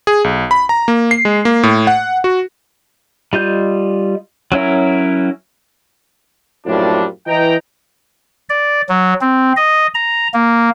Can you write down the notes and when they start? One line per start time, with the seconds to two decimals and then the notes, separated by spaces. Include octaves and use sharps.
0.07 G#4
0.24 B1
0.51 B5
0.69 A#5
0.88 A#3
1.11 C7
1.25 G#3
1.45 A#3
1.63 A2
1.87 F#5
2.24 F#4
3.33 G3 F4 D#5 G6
4.52 F#3 C#4 E4 A#4
6.66 F#2 A2 F3 G3 A#3 D4
7.27 E3 D#5 G5 A#5
8.50 D5
8.89 F#3
9.21 C4
9.57 D#5
9.95 A#5
10.34 A#3